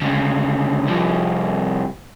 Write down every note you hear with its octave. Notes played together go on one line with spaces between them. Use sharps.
D2 C#3
C2 F3